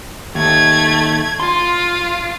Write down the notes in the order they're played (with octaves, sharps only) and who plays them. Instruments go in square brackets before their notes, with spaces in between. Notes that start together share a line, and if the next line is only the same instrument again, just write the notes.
[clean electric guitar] D#2 [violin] A3 G#6
[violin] F4 [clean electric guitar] C6